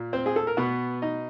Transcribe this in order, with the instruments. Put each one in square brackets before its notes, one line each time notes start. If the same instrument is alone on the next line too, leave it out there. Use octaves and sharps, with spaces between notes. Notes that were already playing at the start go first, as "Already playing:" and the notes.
Already playing: [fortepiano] A#2
C4 C5
G#4
A4
A#4
B2 B3 B4
D#4 D#5